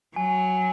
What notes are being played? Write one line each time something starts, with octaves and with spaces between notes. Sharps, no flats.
F#3 G#5